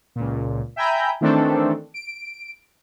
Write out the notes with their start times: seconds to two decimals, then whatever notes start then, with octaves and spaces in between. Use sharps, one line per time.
0.15 C#2 A#2
0.76 E5 G5 G#5 A#5 B5 G6
1.21 D#3 E3 A3 C4 D4 A4
1.94 D7